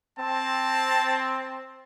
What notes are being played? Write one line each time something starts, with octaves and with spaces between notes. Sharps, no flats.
C4 A5